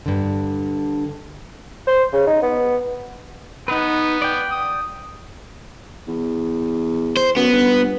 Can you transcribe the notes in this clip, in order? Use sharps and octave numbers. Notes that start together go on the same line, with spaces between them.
G2 D3
C5
C#3
D#4
B3
B3 D#4 B4
D5 G5
D#6
E2
C5
F#2 B3
G1